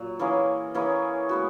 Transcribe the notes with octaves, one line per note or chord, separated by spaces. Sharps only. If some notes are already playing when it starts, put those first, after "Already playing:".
Already playing: A#2 F#3
E3 A#3 C#4 G#4
E3 A#3 C#4 G#4
G#3 B3 F#4